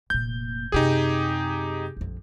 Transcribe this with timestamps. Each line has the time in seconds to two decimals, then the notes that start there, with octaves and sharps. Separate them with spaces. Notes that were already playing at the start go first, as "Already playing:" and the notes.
0.10 F1 A#2 G6
0.72 F#2 C3 D#4 G4 G#4
1.97 A#1 F2